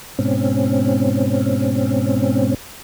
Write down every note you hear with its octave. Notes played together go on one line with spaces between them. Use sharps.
G#2 B2 C4 C#4